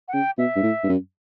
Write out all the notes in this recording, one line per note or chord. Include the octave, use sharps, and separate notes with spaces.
F#5
C#3 G5
B2 E5
G2
A2
G2
F#2